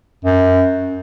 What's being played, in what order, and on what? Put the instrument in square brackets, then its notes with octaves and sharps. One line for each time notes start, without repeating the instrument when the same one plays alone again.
[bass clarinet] F#2